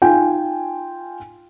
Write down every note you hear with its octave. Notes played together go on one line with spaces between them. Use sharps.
D#4 F4 G5 G#5